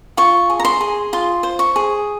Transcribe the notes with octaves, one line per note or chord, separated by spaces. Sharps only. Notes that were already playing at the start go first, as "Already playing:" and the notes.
F4 C#6
G#4
A#5
C6
G#4
F4 C6
C5
C#6
G#4